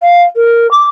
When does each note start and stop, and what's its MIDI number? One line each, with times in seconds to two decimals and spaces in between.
0.02 0.23 77
0.36 0.70 70
0.71 0.84 86